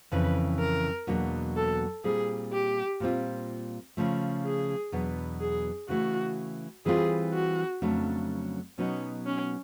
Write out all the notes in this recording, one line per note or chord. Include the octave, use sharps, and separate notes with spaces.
F2 C#3 E3 B4
A#4
E2 B2 F#3 A#3 D4
A4
A#2 G3 C4 G#4
G4
A#2 G3 C4 F4
C#3 F3 A3
G#4
E2 B2 F#3 B3 D4
G#4
C#3 E3 A3 F#4
E3 G3 C4 F4 G#4
F#4
F2 C#3 F#3 A3 D4
B2 F#3 B3 C#4 D#4 F#4
C#4